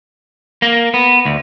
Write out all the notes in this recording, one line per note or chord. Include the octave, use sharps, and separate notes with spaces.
A#3
B3
D2